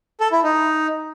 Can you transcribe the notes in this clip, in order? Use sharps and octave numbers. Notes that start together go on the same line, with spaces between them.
A4
E4
D#4